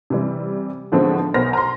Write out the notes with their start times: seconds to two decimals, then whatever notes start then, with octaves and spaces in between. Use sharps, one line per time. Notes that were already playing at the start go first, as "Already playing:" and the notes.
0.10 C3 E3 G3
0.92 A2 D3 F3 G#3 B3 C4
1.34 B1 B3 A#4 C5 F6 A#6
1.53 A#5 C6